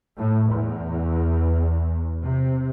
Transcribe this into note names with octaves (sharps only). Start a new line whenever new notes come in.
A2
E2
C3